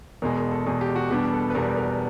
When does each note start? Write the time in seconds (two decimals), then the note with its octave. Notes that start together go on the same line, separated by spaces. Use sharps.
0.22 E2 B2 G#3 A#4
0.37 A#4
0.51 A4
0.66 E2 B2 G#3 G#4
0.81 G4
0.96 F#4
1.10 E2 B2 G3 B3 D4 G4
1.33 A4
1.50 B4
1.55 E2 B2 G3 B3 D4 A#4
1.77 A#4